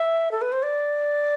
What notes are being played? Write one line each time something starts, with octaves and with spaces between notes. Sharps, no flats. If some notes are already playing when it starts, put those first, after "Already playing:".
Already playing: E5
A4
B4
C5
D5